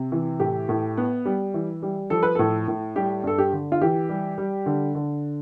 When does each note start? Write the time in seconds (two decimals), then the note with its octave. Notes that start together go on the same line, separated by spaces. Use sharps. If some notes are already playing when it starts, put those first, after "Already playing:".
Already playing: C3
0.12 E3
0.40 A2 G4
0.69 A2
0.97 B3
1.25 G3
1.54 E3
1.83 G3
2.10 F3 A4
2.23 B4
2.35 A2 A4
2.68 A2
2.96 G3 G4
3.24 G2 A4
3.38 G4
3.53 D3
3.72 F4
3.81 E3 G4
4.09 G3
4.38 G3
4.66 D3
4.95 D3